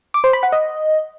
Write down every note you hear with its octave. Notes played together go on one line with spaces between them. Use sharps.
D6
C5
B5
F#5
D#5